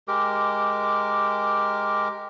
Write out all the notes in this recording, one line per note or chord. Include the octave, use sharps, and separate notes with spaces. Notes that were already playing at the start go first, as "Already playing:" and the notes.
G#3 G4 A#4 D6